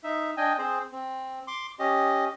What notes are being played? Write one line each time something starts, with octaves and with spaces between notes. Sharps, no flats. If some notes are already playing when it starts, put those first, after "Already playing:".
D#4 E5
D4 D#5 G5 G#5
C4 G#4 C5
C4
C6 D6
C#4 G4 D#5